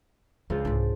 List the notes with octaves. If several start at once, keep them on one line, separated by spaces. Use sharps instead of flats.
C#2 D4 F4 C5
C2 G#2 D4